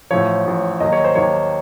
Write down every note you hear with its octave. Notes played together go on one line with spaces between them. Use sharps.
A1 A2 F3 C#5
A1 A2 F3
D#2 D#3 F#3 D#5
C#5
C5
D#2 D#3 F#3 C#5